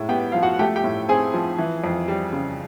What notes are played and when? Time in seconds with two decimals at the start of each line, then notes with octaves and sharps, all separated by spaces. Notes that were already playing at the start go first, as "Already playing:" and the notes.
Already playing: A2 G#3
0.09 B3 G4 G5
0.32 F3 F5
0.42 F#4 F#5
0.59 A3 G4 G5
0.76 G4 G5
0.84 A2
1.09 C4 G#4 G#5
1.34 F3
1.58 E3
1.84 F2
2.08 G3
2.33 C#3